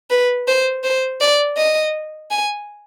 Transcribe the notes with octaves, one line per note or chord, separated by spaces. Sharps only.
B4
C5
C5
D5
D#5
G#5